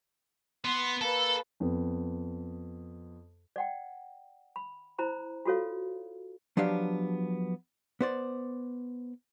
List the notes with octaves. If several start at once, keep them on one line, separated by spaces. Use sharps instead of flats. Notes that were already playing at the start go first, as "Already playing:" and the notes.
B3 C6
A#3 A4 B4
F2 B3
D5 F#5 G5
B5
E4 C5 A#5 B5
F4 F#4 A4 C#5 F5
F3 F#3 B3 D4 G4 F5
B3 C5 D5